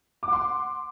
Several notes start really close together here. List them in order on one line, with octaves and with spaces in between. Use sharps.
D6 F#5 C6